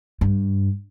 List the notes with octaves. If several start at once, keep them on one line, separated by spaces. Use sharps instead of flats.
G2